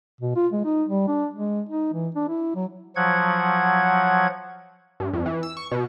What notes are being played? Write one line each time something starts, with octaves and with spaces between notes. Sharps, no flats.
B2
F4
G#3
D#4
G3
D4
G#3
D#4
E3
D4
E4
F#3
F3 F#3 F#5 G#6
G2
F2
E3
E6
C#6
B2